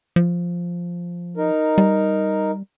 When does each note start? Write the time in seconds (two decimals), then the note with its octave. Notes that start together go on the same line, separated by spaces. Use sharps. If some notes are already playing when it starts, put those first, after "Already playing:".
0.16 F3
1.37 D#4 A#4
1.78 G3